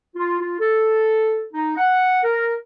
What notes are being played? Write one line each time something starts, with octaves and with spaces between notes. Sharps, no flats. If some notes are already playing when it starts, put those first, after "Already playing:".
F4
F4
A4
D#4
F#5
A#4